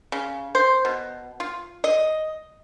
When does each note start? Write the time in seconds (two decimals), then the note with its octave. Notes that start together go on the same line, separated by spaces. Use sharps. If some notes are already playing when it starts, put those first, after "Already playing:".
0.12 C#3
0.55 C5
0.85 B2
1.40 F4
1.84 D#5